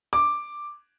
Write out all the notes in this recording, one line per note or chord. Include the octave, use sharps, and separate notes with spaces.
D6